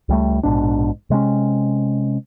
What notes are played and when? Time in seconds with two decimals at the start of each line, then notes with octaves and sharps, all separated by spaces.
0.09 C#2 G3 A3
0.43 A#1 G#2 B2 D4
1.10 C3 G#3 A3 C#4